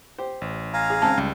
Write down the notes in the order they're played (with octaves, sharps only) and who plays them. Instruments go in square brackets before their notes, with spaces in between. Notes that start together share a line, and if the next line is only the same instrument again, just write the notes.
[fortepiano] G4 C5
[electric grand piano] A1
[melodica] F5 G#5 A#5
[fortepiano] G#4
[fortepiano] G#1 C#3 C4 [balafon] A5
[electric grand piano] C#2 [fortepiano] G3